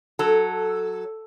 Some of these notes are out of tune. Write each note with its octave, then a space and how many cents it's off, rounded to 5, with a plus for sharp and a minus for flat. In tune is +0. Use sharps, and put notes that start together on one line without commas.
F#3 +0 A4 +0